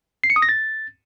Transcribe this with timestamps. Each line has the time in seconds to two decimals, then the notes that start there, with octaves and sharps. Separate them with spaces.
0.24 C7
0.30 C#7
0.36 D#6
0.42 A#6
0.49 A6